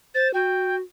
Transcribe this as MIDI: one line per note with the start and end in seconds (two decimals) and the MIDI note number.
0.14 0.33 72
0.14 0.28 93
0.34 0.80 66
0.34 0.76 79